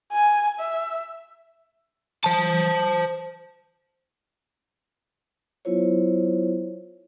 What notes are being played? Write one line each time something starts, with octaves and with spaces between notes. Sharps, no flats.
G#5
E5
C5 A5
F#3 B3 E4 F4 C5 C#5